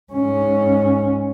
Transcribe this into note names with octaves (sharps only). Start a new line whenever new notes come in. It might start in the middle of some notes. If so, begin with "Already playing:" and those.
G#2 C#4